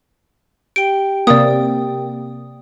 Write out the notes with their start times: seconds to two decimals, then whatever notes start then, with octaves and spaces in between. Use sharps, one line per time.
0.76 G4 G5 D7
1.27 C3 A#3 D5 D#6